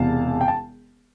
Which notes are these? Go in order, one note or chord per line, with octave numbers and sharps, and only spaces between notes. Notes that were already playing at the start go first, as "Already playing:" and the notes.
Already playing: E1 E2 C3 F5 A5
G5
A5